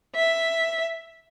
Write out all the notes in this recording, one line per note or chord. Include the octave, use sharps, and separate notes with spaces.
E5